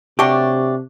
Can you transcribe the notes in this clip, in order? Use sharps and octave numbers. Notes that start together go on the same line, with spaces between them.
C3 F#3 A3 D4 G4